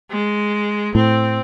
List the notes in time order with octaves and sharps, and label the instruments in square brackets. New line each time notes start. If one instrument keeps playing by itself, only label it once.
[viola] G#3
[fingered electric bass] A2 [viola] C4